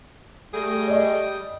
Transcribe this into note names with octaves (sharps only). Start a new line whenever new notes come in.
G3 A3 G#4 G5 D#6 A#6
D5 D#5